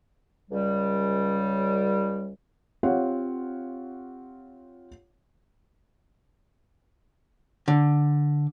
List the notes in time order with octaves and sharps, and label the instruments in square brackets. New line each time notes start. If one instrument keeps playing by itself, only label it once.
[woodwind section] C#2 G3
[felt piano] C4 F4 G4 C#5 F5 F#5
[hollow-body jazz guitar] D3